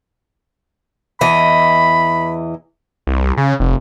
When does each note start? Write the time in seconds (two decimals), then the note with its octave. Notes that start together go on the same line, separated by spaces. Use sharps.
1.21 E2 E3 D#5 B5
3.07 C2
3.37 C#3
3.60 F1